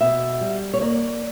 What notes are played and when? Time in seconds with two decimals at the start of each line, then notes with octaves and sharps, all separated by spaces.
0.01 B2 E5
0.41 G3
0.74 C#5
0.81 A#3 D5